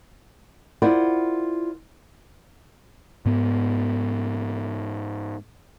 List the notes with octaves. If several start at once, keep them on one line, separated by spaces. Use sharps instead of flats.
E4 F4 A#4 C5 D5 F#5
G#2 B3